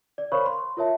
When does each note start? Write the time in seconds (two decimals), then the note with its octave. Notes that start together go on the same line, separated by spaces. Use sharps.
0.18 D5
0.32 A#4 C5 C#5 F5 B5 C#6
0.46 C6
0.77 F4 A#4 C#5 E5 A5